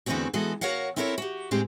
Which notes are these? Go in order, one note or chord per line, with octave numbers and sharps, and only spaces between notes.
E2 D3 E3 A3 C4 F#4
E3 G#3 B3 F#4 A4
F#4 A#4 C#5 F5 F#5
C4 E4 A4 A#4 C5 C#5
F#4 G4
A2 G#3 C4 G4